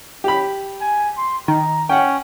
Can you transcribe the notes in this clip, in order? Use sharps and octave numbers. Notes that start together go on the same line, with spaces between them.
G4 B5
G#5
C6
D#3 A#5
C#4 F#5 G5